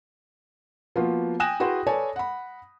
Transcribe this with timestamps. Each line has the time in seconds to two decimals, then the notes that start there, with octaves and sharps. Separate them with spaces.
0.96 F3 A#3 B3 F4 F#4
1.40 G5 G#5 D#6 F#6 A#6 E7
1.60 E4 F#4 G#4 B4 G5 C6
1.86 A4 B4 C#5 D5 G#5 A5
2.16 F#5 B5